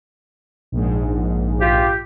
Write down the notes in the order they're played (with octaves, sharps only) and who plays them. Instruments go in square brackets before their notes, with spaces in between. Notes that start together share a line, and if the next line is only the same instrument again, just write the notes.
[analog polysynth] A#1 G#2
[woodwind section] F4 G4